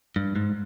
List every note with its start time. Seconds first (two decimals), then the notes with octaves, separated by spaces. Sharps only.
0.16 G2
0.36 G#2